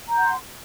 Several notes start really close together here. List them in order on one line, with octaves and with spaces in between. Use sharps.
A#5 G6 F#5 C6